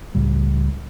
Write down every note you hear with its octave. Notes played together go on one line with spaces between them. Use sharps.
C#2 A2 G3